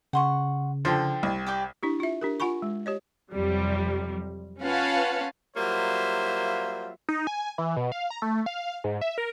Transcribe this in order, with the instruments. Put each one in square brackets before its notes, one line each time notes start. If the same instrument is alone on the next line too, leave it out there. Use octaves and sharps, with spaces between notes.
[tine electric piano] C#3 [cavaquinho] F#5 C6 C#6
[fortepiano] D3 F3 [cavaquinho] G5 C6
[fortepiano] C2
[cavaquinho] G4 D5 G5
[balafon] D4 E4 G4
F4 E5
D4 G4 A#4
F4 F#5 G#5 B5 C#6
G#3
G4 C#5 D#5
[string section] F2 C3 F#3 G3
C#4 F4 B4 F5 F#5 A5
[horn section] F#3 G3 A#3 F4 C5 E5
[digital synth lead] D#4
G#5
E3
B2
F5
A#5
A3
F5
G#2
E5
A#4